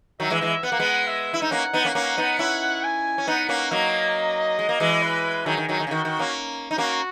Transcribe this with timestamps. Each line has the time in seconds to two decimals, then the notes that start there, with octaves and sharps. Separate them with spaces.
0.20 D#3 F#3 E5
0.30 E3 G#3
0.41 E3 G#3
0.63 B3 F#5
0.72 A#3
0.79 G#3 B3
1.07 E5
1.34 E4
1.42 D#4
1.51 A#3 C#4 F#5
1.73 B3 D#4
1.85 A#3 C#4
1.95 A#3 C#4
2.18 B3 D#4
2.39 C#4 E4
2.84 G#5
3.18 C#4
3.27 B3 D#4 F#5
3.49 A#3 C#4
3.71 F#3 A#3 D#5
4.59 G#3
4.69 A#3
4.80 E3 G#3
5.02 B4
5.46 D#3 F#3 G#4
5.57 D#3
5.68 D#3 F#3
5.80 D#3
5.87 C#3
5.91 D#3 F#4
6.05 D#3
6.19 A#3 C#4
6.71 D#4
6.78 A#3 C#4 F#4